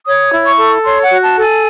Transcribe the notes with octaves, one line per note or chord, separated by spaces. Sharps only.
C#5 D#6
E4
C#6
A4
C#5 C6
F#5
F#4
A5
A4
G#5